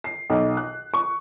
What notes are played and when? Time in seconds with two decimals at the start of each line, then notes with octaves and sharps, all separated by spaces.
0.04 C7
0.30 B1
0.57 F#6
0.94 C#6